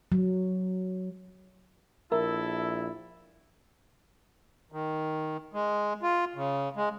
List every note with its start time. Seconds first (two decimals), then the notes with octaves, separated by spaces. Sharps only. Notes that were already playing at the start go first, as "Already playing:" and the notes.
0.12 F#3
2.12 A#1 E4 A4 A#4 E5
4.72 D#3
5.54 G#3
6.03 F4
6.35 C#3
6.76 G#3